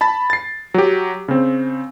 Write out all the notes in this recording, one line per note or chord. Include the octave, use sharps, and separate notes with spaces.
A5 B5 A6
A6 C7
F#3 G4
C#3 C4